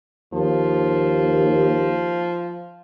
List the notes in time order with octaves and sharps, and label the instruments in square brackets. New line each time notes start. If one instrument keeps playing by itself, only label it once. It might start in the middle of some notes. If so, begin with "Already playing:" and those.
[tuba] D#2 [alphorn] F3